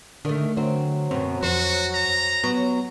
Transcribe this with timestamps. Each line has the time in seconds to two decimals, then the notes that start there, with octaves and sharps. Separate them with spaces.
0.25 D3 D#3 A3
0.57 D3 F#3 C4
1.11 F#2 B2 C4
1.43 F2 F#4 C5
1.94 A#5
2.44 F#3 B3